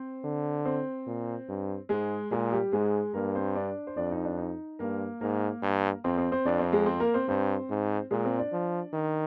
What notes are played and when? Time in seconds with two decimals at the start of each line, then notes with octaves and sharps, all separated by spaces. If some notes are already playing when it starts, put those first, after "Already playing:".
Already playing: C4 C5
0.24 D3
0.65 C4 C5
1.07 A#2
1.49 G2
1.89 G#2 G#3 G#4
2.31 A#2 G#3 G#4
2.52 G3 G4
2.72 G#2 G#3 G#4
3.14 G2 A#3 A#4
3.35 C4 C5
3.55 D4 D5
3.87 C5
3.97 F2 D4 D5
4.11 D#4
4.25 D4
4.38 D#4
4.79 G2 A#3 A#4
5.21 G#2 A#3 A#4
5.62 G2
6.04 F2 C4 C5
6.18 C4 C5
6.32 C4 C5
6.45 F2 D4 D5
6.59 C4 C5
6.73 G#3 G#4
6.86 C4 C5
7.00 A#3 A#4
7.14 C4 C5
7.28 G2 C4 C5
7.70 G#2
8.11 A#2 G#3 G#4
8.25 C4 C5
8.39 D4 D5
8.52 F3
8.93 D#3